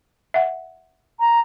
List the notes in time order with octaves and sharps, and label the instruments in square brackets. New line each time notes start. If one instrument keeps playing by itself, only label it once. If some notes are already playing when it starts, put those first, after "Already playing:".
[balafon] E5 F#5
[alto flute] A#5